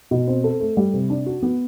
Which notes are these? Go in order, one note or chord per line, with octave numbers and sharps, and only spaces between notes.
B2
C4
A4
A3
G3
C3
D4
F#4
B3